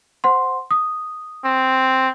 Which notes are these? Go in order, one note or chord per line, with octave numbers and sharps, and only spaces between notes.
C5 F#5 C6
D#6
C4